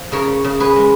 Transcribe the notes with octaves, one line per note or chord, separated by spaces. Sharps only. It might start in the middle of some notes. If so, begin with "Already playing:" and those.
Already playing: F3
C#3 A#4 C#5
C#3
G#4 B4
G#3